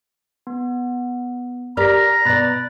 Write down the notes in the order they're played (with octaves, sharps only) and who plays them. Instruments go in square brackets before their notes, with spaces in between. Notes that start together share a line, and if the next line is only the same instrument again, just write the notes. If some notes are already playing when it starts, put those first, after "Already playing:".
[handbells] B3
[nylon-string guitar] G4 A#4 D5 [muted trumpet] A#5 [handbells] F6 B6
[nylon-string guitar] B2 D5 [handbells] B5 F#6 A6